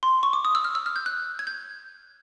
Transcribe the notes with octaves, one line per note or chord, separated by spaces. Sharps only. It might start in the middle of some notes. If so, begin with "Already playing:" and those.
C6
C#6
D6
D#6
E6
F6
E6
F6
G6
F#6
G#6
G6